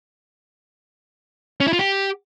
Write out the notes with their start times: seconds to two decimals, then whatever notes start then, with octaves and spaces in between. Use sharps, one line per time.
1.60 C#4
1.67 E4
1.73 F4
1.79 G4